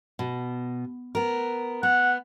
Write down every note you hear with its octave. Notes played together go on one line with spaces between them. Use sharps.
B2
B3 A#4
B3 F#5